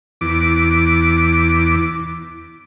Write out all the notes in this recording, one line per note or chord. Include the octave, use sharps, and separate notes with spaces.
E2 D6